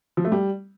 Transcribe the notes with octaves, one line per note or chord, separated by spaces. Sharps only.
F3
A3
G3